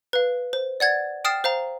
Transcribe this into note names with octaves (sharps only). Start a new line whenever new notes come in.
B4 F5
C5
D5 F#5 G#6 A6
G5 D#6 F6 A6 C7 E7
C5 F5 A#5